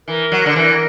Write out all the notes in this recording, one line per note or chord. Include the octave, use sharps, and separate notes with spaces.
E3 A#4
F#3
D3
E3